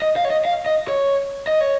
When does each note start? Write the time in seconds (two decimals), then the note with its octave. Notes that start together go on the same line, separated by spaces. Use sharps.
0.02 D#5
0.16 F5
0.25 C#5
0.30 D#5
0.45 F5
0.66 D#5
0.88 C#5
1.47 D#5
1.61 C#5